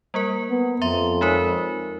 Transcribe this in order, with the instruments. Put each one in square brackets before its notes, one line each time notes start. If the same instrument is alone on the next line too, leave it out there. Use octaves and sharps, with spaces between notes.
[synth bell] G3 A#3 A#4
[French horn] B3
[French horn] F2 [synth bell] E5 A#5 C6
[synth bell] G#3 D#4 A#4